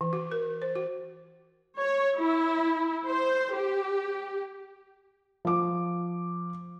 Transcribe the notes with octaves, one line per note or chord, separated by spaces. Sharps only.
E3
F#4
A#4
C5
F#4
C#5
E4
C5
G4
F3 D6